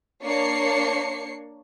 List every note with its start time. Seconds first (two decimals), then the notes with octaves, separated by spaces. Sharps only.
0.23 A#3 D4 C#5 C7 C#7